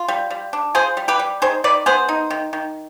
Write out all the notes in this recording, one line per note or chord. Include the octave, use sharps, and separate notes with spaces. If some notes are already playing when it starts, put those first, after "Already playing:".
Already playing: F4
G3
G3
D4
F4 G#4 C5
G3
G4 B4
G3
D#3 G#4 C5
D#3 B4 D5
B3 G#4 C5
D#4
D#3
D#3